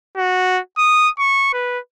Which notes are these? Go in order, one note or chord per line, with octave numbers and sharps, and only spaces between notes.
F#4
D#6
C#6
B4